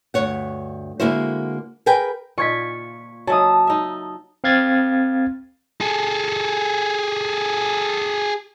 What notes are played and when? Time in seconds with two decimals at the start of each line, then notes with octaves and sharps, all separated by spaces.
0.14 D2 G2 C#5 F#5
1.00 D3 G#3 A#3 E4 F#4 C5
1.86 G#4 A#4 B4 G5 G#5
2.38 A#2 F4 C#6 G#6 B6
3.27 F#3 E5 A5 D#6
3.67 D#4 E5
4.44 C4 F5 G#6 A6
5.81 G#4 A4